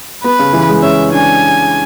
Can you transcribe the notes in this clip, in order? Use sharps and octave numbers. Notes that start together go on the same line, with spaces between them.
B3 B4
C#3
E3
G#3
C#4 E5
D4 G#5